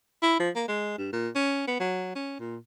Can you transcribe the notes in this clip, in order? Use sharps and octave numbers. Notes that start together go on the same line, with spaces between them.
E4
F3
A#3
G#3
G2
A#2
C#4
B3
F#3
C#4
A#2